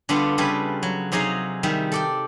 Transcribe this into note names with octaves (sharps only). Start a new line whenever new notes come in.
D3 G3 B3 D4 F4
C#3 G3 A4 B4 G#5
F#3
C3 F#3 D#4 G#4 D#5 F5
D#3 G3 E5
A4 D5 G5